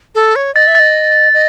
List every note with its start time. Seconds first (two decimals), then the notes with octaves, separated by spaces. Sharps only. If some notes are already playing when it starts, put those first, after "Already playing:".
0.15 A4
0.36 C#5
0.55 D#5 A6
0.67 E5
0.75 D#5 A6
1.34 D#5